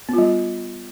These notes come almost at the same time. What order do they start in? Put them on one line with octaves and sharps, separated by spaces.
B3 F4 G3